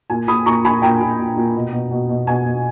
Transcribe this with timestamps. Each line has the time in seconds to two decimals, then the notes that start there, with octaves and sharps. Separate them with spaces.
0.10 A#2 G#5
0.28 A#2 B5 D#6
0.46 A#2 A#5 C#6
0.65 A#2 G#5 B5
0.82 A#2 G5 A#5
1.01 A#2
1.19 A#2
1.36 A#2
1.56 B2
1.73 B2
1.91 B2
2.09 B2
2.27 B2 G#5
2.46 B2